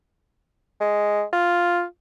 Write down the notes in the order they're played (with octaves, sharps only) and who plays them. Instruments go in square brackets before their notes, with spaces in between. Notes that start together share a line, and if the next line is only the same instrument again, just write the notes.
[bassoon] G#3
F4